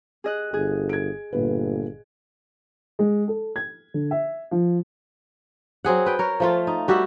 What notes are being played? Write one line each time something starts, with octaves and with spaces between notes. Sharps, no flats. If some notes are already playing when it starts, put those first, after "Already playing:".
G#4 D#5 F#6
G1 G#4
G#6 D7
G1 A#2 B4
G#3
A4
G#6
D3
E5
F3
F#3 C4 G#4 F#5
B4 G5
A#4 C#5
F3 A3 F4
D#4
G3 F#4 G4 E5